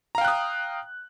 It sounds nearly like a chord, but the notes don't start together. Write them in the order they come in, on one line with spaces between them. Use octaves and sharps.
A#5 F5 G5 F#6 D#6